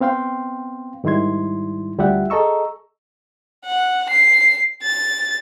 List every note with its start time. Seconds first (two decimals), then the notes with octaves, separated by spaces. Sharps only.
0.01 B3 C4 F5 G5 C6
1.04 G#2 D#3 G3 E4 C6 G#6
1.98 D2 G3 F4 G4 E5 F#5
2.30 G#4 A4 D#5 A#5 C#6 E6
3.66 F#5
4.10 C7
4.83 A6